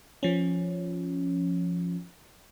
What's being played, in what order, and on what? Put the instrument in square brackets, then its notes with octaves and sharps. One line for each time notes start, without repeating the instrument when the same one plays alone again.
[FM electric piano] F3 C#4